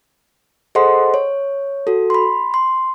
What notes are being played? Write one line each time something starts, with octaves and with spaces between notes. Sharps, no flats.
G#4 A4 C5 D#5 F#5 C6
C#5
F#4 A4
B5 C6
C6